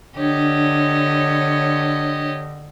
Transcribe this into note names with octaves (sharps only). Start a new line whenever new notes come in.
D3 D4 G4 C#5 D#5